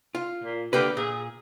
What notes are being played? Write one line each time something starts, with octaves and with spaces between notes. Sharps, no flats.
F4
A#2
D3 A#3 G4 B4
A#2 G#4